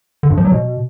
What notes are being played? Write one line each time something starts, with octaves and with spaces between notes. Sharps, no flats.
D3
G2
F3
F#3
B2